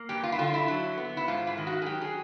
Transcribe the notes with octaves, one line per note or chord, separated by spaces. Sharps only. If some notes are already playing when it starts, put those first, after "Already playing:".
Already playing: A#3
G2 G4
F4
E4
D3 F4
E4
F#3
B3
E4
G#2 F4
E4
D#3
F#4
G#4
F#3 G4
G#4